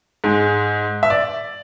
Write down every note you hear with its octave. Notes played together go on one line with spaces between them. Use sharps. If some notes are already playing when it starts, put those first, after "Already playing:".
G#2 G#3
E5
D5